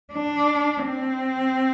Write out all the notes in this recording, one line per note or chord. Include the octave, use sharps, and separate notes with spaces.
D4
C4